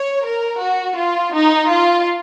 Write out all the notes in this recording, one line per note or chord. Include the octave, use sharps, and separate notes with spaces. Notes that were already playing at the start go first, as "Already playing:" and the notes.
Already playing: C#5
A#4
F#4
F4
D#4
F4